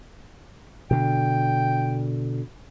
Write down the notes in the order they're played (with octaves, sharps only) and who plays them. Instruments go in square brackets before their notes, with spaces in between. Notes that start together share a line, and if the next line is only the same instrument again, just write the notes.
[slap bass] B2 D3 [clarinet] G5